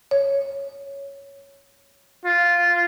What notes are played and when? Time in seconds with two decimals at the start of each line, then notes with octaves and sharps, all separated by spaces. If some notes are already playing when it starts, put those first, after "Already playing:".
0.11 C#5
2.26 F4